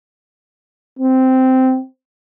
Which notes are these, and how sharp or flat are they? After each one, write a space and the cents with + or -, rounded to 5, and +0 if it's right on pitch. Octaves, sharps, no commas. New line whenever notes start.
C4 -10